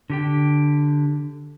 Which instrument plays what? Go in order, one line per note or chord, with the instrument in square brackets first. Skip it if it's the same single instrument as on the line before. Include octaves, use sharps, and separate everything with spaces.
[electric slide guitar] D3 G4 G5